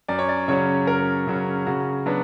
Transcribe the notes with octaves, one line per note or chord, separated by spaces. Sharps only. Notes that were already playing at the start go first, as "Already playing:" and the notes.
F#2 D5
C#5
D5
C#3 F#3 C#4 C#5
F#2 A#4
C#3 F#3 C#4
C#3 F#4
F#3 B3 D4